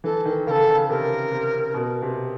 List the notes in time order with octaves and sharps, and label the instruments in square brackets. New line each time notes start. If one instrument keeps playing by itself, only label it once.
[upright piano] E3 [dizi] A4
[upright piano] D#3
[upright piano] C#3 [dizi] A#4
[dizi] A4
[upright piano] C#3
[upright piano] C3 [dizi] A#4
[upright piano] C3
B2
C3